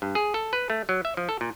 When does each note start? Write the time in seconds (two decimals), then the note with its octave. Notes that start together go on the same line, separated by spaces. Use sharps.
0.02 G2
0.15 G#4
0.34 A4
0.53 B4
0.70 A3
0.89 F#3
1.05 E5
1.17 F3
1.29 A4
1.41 A#2